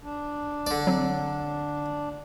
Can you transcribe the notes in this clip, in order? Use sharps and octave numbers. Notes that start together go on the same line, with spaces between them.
D4
D3 D5
F#3 C4